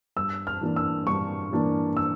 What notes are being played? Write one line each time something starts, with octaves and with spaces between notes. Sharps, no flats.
G2 E6
F6
E3 A#3 D4
E6
G2 C#6
E3 A#3 D4
E6